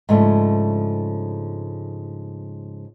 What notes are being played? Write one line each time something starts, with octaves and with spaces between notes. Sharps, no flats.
G#2 C#3 F3 A3 D4